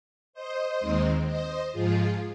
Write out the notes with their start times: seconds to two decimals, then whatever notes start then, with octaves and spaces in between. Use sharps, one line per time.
0.33 C5 D#5
0.80 D#2 D#3 G#3 C4
1.27 C5 D#5
1.72 G#2 F3 G#3 F4 G#4